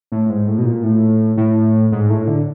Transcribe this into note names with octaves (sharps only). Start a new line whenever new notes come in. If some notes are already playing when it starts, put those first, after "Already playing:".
A2
G#2
A2
B2
A#2
A2
A2
G#2
A2
D3